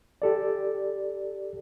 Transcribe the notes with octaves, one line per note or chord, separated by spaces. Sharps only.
G4 A4 D5